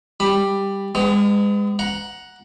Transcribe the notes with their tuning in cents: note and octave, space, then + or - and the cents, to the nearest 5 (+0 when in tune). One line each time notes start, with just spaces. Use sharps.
G3 +5 B5 +0
G#3 -25 B3 +40
F#5 +0 A#5 +15